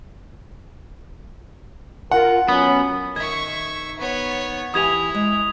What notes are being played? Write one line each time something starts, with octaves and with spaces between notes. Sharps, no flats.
F4 A#4 F#5
F#3 B3 C#4
D#3 E5 C#6 G#6
B3 C#5
E3 E4 G4 G#5 D#6 G#6 F7
G#3